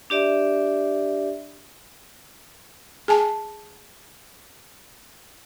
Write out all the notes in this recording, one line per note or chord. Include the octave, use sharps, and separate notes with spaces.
D4 G4 D5 E5
G#4 G#5 A5